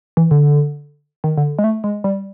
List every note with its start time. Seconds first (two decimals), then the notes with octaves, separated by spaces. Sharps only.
0.17 E3
0.31 D3
1.24 D#3
1.37 D3
1.59 G#3
1.64 A3
1.84 G#3
2.04 G3